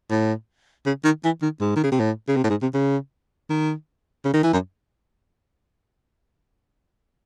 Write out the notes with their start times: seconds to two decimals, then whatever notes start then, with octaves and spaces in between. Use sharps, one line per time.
0.10 A2
0.86 C#3
1.04 D#3
1.24 E3
1.42 D#3
1.61 G#2
1.76 D#3
1.83 C#3
1.92 C3
1.99 A2
2.28 C#3
2.36 C3
2.44 A2
2.50 G#2
2.62 C3
2.74 C#3
3.50 D#3
4.25 C#3
4.33 D#3
4.43 E3
4.53 F#2